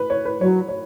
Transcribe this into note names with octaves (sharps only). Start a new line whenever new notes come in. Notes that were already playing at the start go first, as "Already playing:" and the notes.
Already playing: B4
C#5
B4
F#3 C#5
C#5